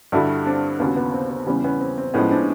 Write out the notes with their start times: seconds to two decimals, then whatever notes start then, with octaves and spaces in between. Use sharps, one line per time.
0.12 G2 D3 G3 E4 F#4
0.46 C4 D4
0.79 D#2 C#3 F#3 B3 C#4
0.96 B3
1.14 C4
1.30 C4
1.47 E2 C#3 E3 G3 B3 C#4
1.64 B3 C#4
1.81 C4
1.98 C4
2.14 A2 F3 G#3 B3 C#4
2.31 C4 D4